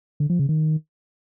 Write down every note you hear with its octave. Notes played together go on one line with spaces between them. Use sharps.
D3
F3
C#3
D#3